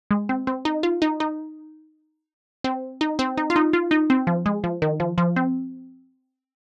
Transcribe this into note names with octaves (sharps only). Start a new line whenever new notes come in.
G#3
C4
C4
D#4
F4
D#4
D#4
C4
D#4
C4
D#4
F4
D#4
F4
D#4
C4
F3
G#3
F3
D#3
F3
F3
C4